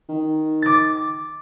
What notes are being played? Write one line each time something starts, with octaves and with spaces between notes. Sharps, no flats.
D#3
D6 A6